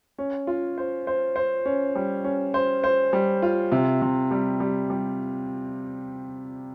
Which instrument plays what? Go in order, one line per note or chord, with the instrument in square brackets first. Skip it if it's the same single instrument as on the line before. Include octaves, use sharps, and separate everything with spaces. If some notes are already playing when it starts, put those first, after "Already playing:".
[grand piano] C#4
F4
C5
C5
C5
C#4
G3
C#4
C5
C5
G3
F4
C3
C3
G3
G3
G3